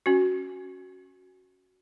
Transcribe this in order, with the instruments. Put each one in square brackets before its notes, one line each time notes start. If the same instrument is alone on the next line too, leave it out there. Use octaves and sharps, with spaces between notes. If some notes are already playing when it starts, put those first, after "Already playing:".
[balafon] C#4 F#4